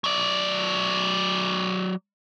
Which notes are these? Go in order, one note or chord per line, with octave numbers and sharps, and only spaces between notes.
F#3 D5